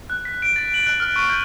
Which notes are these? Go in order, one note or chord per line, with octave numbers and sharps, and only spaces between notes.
F#6
B6
D7
A6
F#7
F#6
F6
C#6
G6